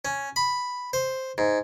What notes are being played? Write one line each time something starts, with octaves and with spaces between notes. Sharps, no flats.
C#4
B5
C5
G#2